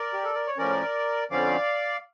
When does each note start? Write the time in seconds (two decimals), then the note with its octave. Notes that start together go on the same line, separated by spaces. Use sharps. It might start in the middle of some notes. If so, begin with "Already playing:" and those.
Already playing: A#4 D5
0.13 G4
0.24 A4
0.35 A#4
0.47 C#5
0.57 A2 F3 C#4 A#4 D5
1.31 F2 D3 F3 C#4 D5 F5